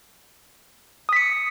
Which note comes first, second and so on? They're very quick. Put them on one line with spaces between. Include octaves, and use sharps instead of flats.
D#6 B6 C#7